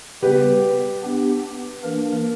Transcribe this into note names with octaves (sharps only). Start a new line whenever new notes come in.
C#3 G3 B3 G4 B4
B3 D4 G4
E3 A#3 D4 A#4